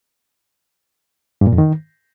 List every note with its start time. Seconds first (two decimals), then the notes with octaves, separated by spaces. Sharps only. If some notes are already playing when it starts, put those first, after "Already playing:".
1.41 G2
1.47 A#2
1.53 F2
1.58 D#3